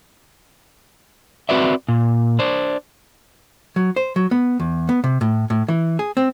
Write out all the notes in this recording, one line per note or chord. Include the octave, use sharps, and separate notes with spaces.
C4 F#4 B4 D5 E5
A#2
D4 C5 D5
F#3
C5
F#3
B3
E2
B3
C3
A2
A2
E3
G#4
C4